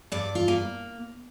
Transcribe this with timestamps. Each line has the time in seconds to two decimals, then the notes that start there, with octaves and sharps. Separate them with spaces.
0.12 G2 D5
0.35 F4
0.48 A#3